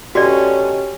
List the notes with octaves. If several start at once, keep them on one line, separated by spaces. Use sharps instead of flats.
B2 D3 A3 C#4 F#4 G4 D5